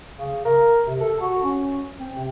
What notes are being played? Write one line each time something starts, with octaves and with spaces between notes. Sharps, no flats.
C#3
A#4
C3
A4
F#4
C#4
C4
C3